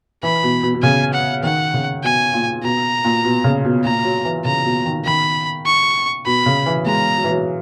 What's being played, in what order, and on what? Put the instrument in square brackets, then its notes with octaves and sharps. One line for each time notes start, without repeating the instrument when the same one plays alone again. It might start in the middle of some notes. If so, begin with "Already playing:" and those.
[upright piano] E3 [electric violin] B5
[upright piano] B2
B2
B2
[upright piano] C#3 [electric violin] G#5
[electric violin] F#5
[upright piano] D#3 [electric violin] F#5
[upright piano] C#3
[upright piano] B2 [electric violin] G#5
[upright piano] A#2
[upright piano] B2 [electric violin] A#5
[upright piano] A#2
B2
C#3
B2
[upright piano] A#2 [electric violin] A#5
[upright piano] F#3
E3
[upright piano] C#3 [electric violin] A#5
[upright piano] B2
D#3
[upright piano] D#3 [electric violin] B5
[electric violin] C#6
[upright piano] B2 [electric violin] B5
[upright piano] C#3
E3
[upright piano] G#3 [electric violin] A#5
[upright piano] F#3
E3
F#3